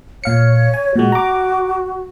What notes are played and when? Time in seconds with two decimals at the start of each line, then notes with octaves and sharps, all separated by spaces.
0.24 A#2 C#5 F5 C#7
0.74 G#5
0.96 A#2 G#3 F#4
1.12 A#5 D6